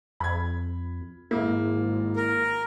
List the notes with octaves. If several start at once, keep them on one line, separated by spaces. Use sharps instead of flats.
F2 B5 G#6
G#1 G#2 A#3 E4
A#4